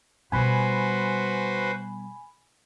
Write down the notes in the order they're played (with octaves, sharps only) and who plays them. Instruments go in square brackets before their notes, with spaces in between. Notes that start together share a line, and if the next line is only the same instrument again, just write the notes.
[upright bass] B2 G3 [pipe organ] F#4 B4 C5 [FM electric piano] G#5 B5